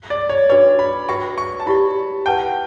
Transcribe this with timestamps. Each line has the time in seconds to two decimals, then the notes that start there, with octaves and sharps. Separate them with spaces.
0.10 D5
0.29 C#5
0.49 D4 F#4 B4 C#5 D5
0.79 B5
1.09 F#4 B4 E5 G5 C#6
1.38 C#6
1.60 A5
1.66 E4 G4 D5 B5
2.26 B4 F#5 G5 A5